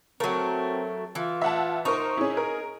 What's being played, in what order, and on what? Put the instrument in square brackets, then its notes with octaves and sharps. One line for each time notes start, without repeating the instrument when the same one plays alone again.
[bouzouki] F#3 A3 [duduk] C4 [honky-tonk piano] A#4
[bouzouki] E3 [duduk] F4
[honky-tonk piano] E5 F#5 A5
[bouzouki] D#4 [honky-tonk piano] A#4 C5 C#6
[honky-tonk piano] C#4 E4 [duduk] G#4
[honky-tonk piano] A#4